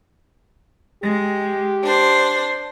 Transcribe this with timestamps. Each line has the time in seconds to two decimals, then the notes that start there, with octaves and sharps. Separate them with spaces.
1.03 G#3 G4
1.83 D4 C5